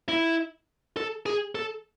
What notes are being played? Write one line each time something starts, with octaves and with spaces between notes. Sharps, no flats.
E4
A4
G#4
A4